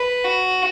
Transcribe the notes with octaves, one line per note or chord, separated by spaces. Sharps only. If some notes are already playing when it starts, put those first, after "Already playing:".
Already playing: B4
F#4